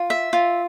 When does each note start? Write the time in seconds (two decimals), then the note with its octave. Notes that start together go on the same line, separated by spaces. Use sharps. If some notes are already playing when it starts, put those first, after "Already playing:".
Already playing: F4
0.10 E5
0.33 F4